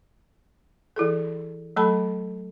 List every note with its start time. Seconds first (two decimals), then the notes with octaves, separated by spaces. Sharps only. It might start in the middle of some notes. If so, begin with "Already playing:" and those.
0.96 E3 E4 G#4 A4
1.76 F#3 A3 A4 A5 B5